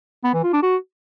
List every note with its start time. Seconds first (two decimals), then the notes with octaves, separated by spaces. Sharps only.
0.24 B3
0.34 E3
0.43 F4
0.53 D4
0.63 F#4